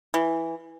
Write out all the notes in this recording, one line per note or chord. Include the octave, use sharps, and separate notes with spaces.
E3